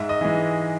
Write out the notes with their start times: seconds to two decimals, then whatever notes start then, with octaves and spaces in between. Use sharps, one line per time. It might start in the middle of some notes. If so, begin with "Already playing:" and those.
Already playing: G#2 E5
0.09 D#5
0.21 E3 G#3